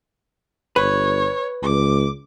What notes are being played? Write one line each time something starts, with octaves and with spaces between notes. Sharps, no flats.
G1 B4 C#5
C#2 D6